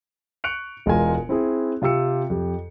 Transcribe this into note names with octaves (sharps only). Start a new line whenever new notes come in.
C#6 F#6 C#7 D7 F7
E1 G#3 F4 A#4 G#5
C4 E4 G#4
C3 F4 G4 E6 C#7
F2 G4